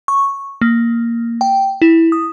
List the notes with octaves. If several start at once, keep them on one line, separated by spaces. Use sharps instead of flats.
C#6
A#3
G5
E4
D#6